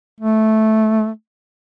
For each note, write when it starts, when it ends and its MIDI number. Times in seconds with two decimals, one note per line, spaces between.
0.20 1.09 57